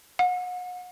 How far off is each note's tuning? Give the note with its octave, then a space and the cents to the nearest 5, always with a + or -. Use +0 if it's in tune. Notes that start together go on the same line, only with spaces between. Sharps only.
F#5 -35